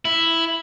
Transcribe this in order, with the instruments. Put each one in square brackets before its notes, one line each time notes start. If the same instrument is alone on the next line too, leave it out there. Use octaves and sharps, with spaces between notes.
[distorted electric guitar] E4